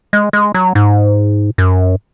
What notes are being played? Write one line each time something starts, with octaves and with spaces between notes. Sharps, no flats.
G#3
G#3
F#3
G#2
F#2